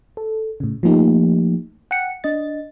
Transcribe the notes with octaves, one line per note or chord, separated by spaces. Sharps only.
A4
A2 C#3
F3 A3 A#3 D#4 G4
F#5 G5 C#7
D4 D#5 A6